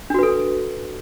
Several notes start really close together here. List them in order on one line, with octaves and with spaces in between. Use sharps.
D4 F#4 B4 A4